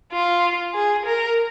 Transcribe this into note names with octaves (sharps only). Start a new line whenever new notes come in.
F4
G#4
A#4